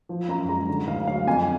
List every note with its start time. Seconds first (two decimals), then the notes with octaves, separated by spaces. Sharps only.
0.09 F3
0.28 F#2 A#5
0.49 G#3 A#5
0.69 D3
0.87 D2 F5
1.07 F#3 F5
1.27 F2 G#5